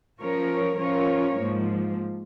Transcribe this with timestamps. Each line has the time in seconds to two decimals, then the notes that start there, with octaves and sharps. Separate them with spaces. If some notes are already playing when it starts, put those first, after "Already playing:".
0.20 F3 C#4 A#4 C#5
0.79 F3 C#4 F4 A#4 C#5
1.38 G#2 F3 A#3